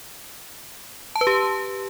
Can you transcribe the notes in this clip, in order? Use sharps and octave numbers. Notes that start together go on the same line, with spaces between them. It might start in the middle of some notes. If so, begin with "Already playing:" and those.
A5
B4
G4